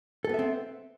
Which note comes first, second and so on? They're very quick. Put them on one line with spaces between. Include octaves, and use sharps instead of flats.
A4 B3 E5 C4